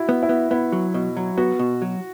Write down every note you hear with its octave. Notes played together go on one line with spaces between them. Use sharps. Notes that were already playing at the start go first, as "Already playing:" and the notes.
Already playing: E4 F#4
B3
E4
B3
B3 E4
F#3
B2
F#3
B3 F#4
B2
F#3